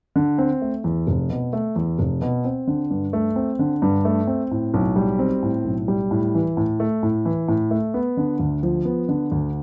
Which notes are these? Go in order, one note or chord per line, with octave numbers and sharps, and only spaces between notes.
D3
C4
A3
E2
F1
B2
A3
E2
F1
B2
C4
D3
G2
A3
C4
D3
G2
A3
C4
A2
B1
G3
C4
A2
B1
G3
A2
E3
A2
A3
A2
E3
A2
A3
B3
D3
D2
F3
B3
D3
D2